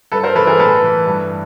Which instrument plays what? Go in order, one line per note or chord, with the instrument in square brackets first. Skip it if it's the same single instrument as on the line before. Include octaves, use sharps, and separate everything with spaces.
[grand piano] G2 A4 B4
A#4 C5
E3 A4 B4
G#4 A#4
A2 A4 B4
E3
G2